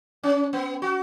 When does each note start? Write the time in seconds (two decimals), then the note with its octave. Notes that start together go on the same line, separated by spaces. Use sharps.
0.23 C#4
0.53 B3
0.82 F#4